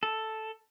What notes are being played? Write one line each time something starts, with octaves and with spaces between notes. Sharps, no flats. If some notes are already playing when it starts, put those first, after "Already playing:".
A4